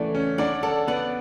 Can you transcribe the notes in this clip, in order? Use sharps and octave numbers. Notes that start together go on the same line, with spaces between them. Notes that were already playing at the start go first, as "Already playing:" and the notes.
Already playing: E3 A3 C#4 D5 F#5
C#4
D4 D5 F#5
A4 D5 F#5
B3 D5 F#5